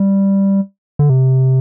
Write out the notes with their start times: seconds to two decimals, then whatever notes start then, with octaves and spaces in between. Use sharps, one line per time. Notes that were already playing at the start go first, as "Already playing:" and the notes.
Already playing: G3
0.99 D3
1.10 C3